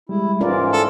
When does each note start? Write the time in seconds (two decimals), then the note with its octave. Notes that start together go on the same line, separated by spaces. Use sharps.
0.09 G3 G#3 E4
0.41 G#2 E3 C#4 F4 A#4 D5
0.72 A4